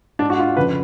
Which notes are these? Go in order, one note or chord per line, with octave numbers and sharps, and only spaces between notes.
G#2 D4
F#4
F4
F2 C#3 B4